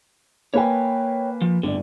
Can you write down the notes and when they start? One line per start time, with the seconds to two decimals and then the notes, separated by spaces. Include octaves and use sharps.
0.54 A#3 B4 C#5 G5 G#5
1.42 F3
1.63 G1 A2 D3 D5